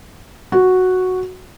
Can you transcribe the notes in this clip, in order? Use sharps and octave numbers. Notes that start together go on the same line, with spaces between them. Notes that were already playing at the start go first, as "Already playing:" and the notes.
F#4